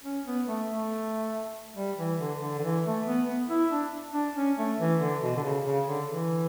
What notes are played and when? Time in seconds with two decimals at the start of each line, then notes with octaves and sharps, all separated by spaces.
0.04 C#4
0.26 B3
0.47 A3
0.68 A3
1.76 G3
1.98 E3
2.19 D3
2.41 D3
2.59 D3
2.63 E3
2.85 A3
3.06 B3
3.28 B3
3.49 E4
3.71 D4
4.14 D4
4.36 C#4
4.58 A3
4.79 E3
5.00 D3
5.22 B2
5.36 D3
5.43 C#3
5.65 C#3
5.87 D3
6.08 E3